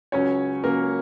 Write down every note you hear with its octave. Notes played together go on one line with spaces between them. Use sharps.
C#2 C#3 F#3 C#4 C#5
C#2 C#3 F#3 A#3 A#4